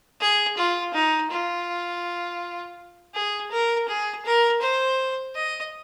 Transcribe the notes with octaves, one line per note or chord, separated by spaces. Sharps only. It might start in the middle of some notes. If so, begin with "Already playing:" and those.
G#4
F4
D#4
F4
G#4
A#4
G#4
A#4
C5
D#5